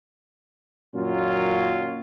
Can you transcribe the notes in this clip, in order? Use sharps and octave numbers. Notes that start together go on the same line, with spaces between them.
F#2 A#2 D#3 F#3 C#4 F4